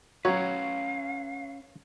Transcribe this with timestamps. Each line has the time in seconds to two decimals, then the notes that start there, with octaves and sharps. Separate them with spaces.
0.25 F#3 C#4 B4 C#5 F5